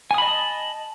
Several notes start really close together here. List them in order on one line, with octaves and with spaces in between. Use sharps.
G#5 D#6 B5 D#5 A5